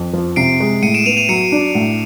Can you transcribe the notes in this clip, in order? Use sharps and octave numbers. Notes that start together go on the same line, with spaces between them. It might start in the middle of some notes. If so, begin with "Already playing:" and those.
Already playing: F2
F3
C3 C7 D7
G#3
A2 C#7 D#7
D7 E7
B3 D#7 F7
D#7 F7
F#3 C#7 D#7
D4
A2